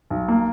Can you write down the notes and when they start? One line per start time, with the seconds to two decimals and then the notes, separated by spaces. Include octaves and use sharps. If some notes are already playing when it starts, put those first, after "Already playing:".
0.10 B1
0.28 A#3